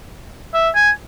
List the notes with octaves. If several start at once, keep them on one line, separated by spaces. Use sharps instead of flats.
E5
G#5